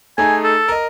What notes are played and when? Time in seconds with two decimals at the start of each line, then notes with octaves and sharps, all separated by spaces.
0.18 A3 D#4 G#4 G#5
0.44 A4
0.68 A#4 D#5